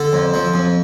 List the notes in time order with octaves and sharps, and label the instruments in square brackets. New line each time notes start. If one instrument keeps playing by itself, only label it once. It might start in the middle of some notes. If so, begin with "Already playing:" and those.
Already playing: [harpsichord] D3 A4
F2
F3
F2